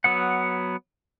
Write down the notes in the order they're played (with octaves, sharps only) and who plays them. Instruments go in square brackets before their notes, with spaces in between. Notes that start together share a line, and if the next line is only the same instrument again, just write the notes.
[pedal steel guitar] F#3 B3 F#5